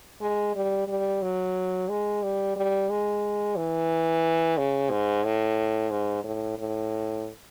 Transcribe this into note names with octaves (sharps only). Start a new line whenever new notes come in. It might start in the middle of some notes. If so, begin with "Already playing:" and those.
G#3
G3
G3
F#3
G#3
G3
G3
G#3
E3
C#3
G#2
A2
G#2
A2
A2